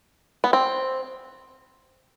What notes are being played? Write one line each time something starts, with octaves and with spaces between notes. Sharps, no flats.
B3
C4